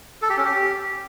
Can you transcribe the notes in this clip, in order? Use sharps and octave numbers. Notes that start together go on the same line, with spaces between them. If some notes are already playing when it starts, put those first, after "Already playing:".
A4
G4
C#4
G4